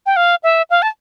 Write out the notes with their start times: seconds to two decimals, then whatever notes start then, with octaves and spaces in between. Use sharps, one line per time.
0.06 G5
0.16 F5
0.43 E5
0.70 F5
0.82 A5